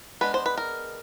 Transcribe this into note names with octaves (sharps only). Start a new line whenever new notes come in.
G#3 B3 D4 B4
C5
B4
A#4